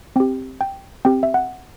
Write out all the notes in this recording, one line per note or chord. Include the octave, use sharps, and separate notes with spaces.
C4 G4 G5
G5
C4 G4 G5
E5
F#5